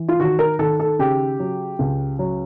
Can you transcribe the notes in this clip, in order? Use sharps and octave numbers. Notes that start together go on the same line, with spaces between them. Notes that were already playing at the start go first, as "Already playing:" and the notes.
Already playing: E3
F4
D#3 F#4
A#4
D#3 A4
A4
C#3 G4
F#3
C#2
F#3